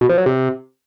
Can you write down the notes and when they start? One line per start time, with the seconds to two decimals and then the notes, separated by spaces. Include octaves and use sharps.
0.01 B2
0.09 F3
0.18 F#3
0.26 C3